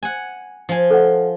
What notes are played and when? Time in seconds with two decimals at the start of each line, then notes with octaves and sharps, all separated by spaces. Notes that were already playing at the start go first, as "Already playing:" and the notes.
0.03 F#5 G#5
0.69 F3 G#5
0.91 A4 F#5